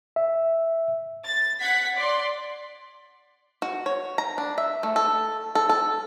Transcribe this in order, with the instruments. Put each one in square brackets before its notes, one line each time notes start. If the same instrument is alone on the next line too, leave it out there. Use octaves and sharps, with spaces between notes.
[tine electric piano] E5
[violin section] A6
F#5 G#6 B6
D5 C6
[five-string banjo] F#4
C#5
A#5
D4
E5
A3
A4
A4
A4